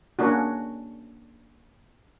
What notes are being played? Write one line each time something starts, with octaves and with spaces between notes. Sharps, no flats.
A#3 C#4 D4 F#4